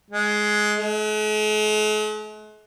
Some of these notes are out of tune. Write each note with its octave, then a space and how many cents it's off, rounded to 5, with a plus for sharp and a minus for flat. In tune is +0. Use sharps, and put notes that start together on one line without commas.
G#3 +10
G#3 +45